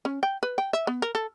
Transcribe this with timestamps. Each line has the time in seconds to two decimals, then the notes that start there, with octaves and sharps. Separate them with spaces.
0.05 C#4
0.23 G5
0.43 B4
0.58 G5
0.73 E5
0.87 B3
1.02 A#4
1.15 A4